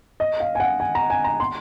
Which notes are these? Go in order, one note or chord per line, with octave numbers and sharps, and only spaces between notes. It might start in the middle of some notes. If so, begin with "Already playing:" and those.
D#5
F5
G#5
F#5
G#5
A#5
G#5
A#5
C6